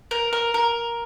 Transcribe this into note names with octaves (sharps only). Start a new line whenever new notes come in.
A#4
A#4
A#4